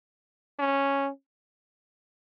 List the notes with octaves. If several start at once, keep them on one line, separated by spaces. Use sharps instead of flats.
C#4